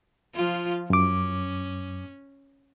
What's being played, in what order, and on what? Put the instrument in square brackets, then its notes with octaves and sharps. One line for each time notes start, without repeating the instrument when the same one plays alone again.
[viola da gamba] F3 F4
[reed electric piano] F#2 D6 [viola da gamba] C#4